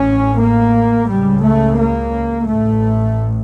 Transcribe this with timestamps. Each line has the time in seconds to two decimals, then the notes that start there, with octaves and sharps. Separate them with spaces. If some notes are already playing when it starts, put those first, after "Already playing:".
Already playing: A1 A2 C#4
0.41 A#3
1.09 C#2 C#3 G3
1.44 A3
1.79 A#3
2.47 A1 A2 A3